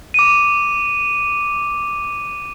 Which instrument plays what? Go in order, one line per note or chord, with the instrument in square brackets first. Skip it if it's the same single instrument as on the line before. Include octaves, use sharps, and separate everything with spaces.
[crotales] D6 D#7